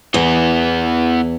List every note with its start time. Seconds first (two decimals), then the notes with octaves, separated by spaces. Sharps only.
0.14 E2 E3 B3